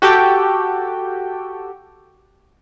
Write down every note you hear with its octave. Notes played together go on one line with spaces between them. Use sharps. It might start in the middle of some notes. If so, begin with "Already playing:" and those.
F#4 G4 A4 G5